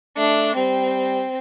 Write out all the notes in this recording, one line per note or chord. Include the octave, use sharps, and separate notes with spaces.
A3 D4
G3 C4